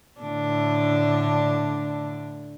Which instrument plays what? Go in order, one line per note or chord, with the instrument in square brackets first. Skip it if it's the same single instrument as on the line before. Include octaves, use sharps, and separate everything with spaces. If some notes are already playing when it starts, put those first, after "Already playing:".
[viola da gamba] A2 D3 D4